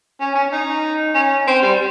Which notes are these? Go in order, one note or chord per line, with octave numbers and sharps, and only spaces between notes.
C#4
C#4
D#4
C#4
C4
G3